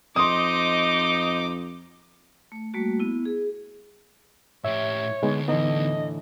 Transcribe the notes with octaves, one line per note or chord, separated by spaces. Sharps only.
F2 D#4 C5 D#5 C6 D6 D#6
A3
G3 A3 A#3 F#4
B3 E4
G#4
A2 G4 C#5 E5
D2 G#3 B3 D#4
A2 D3 E3 B3 D#4 D#5